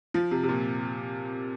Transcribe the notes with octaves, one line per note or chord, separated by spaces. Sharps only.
F3
C3
C3
A#2